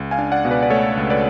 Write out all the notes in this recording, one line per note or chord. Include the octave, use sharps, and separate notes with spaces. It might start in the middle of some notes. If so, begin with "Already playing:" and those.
Already playing: C#2
F5 G#5
D4
D5 F#5
B2
B4 D5
D5
A3 A4 C#5
C#2
B4 D5